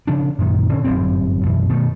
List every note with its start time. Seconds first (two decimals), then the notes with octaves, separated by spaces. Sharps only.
0.07 C#3 F3 D4
0.39 F#2 A#2 D3 D#3
0.71 D3 C#4
0.84 G1 F#2 A2 C4
1.45 F#2 B2 E3
1.69 B2 D#3 E3 A3